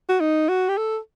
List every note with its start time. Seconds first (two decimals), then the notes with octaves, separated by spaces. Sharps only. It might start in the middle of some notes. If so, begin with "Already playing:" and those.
0.09 F#4
0.20 D#4
0.48 F#4
0.69 G4
0.77 A4